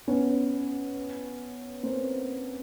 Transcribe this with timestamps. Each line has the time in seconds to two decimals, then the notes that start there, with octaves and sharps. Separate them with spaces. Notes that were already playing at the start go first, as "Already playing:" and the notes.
0.08 B3 C#4
1.83 A#3 C4